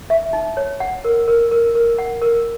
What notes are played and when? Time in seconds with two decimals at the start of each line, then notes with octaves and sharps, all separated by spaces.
0.10 E5
0.33 D#4
0.57 C#5
0.80 F#5
1.05 A#4
1.28 A#4
1.51 A#4
1.75 A#4
1.99 F#5
2.22 A#4